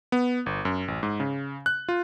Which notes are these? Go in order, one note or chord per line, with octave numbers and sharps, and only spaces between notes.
B3
G1
F#2
A1
G#2
C#3
F#6
F4